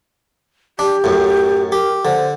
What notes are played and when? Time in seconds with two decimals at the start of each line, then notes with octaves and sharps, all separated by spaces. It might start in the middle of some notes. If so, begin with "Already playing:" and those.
0.79 D4 G4
1.04 F#2 A2
1.72 G4 A#4
2.05 D3 C5